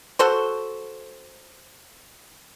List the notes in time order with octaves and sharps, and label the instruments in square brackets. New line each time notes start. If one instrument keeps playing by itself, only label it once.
[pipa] F#4 A4 C5